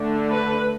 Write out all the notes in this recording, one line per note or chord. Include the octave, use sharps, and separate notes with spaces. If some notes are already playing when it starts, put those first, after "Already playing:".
Already playing: D3 A3 D4
B4